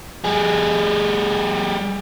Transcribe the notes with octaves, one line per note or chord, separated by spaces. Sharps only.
G3 G#4